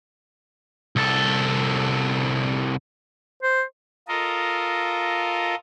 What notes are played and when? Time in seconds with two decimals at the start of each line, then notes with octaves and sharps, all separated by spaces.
0.96 C2 A4
3.43 C5
4.08 F4 A4 A#4 D#5